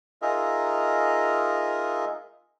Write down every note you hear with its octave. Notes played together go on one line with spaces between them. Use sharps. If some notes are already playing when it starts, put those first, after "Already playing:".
D#4 F4 G#4 A#4 D#5 E5